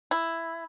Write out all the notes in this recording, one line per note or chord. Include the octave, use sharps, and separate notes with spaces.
E4